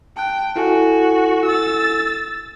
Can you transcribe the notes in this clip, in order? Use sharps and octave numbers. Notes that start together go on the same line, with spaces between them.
G5 A5 F#6
E4 F#4 A4 G#5
E6 A6